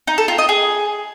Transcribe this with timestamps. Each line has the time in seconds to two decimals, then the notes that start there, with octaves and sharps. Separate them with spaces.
0.07 D#4
0.18 A4
0.28 F4
0.38 D#5
0.49 G#4